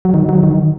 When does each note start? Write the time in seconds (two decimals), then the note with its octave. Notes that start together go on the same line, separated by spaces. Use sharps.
0.05 F#3
0.14 D#3
0.29 F#3
0.43 D#3